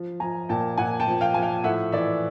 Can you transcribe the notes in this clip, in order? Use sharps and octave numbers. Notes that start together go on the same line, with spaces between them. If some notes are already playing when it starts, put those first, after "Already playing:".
Already playing: F3
F3 G#5 A#5
A#2 G5 A5
A#2 F#5 G#5
G5 A5
F3
F5 G5
F3 G#5
F5 G5
A2 E5 F#5
E3 D5 E5